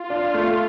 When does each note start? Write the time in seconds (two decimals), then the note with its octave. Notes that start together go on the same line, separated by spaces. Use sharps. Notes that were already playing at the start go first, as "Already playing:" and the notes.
Already playing: F4
0.10 D4
0.34 A3